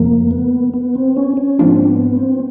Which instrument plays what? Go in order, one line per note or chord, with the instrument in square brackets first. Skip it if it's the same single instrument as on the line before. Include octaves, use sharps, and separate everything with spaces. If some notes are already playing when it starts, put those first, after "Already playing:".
Already playing: [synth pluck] F2 C#3 F3 A3 [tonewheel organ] A#3
[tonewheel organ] B3
B3
C4
C#4
C#4
[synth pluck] G#2 F3 A#3 D4 F4 [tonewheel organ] C4
[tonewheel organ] B3
C4